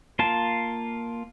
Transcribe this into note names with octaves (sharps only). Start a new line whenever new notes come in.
A#3 F4 F5 A5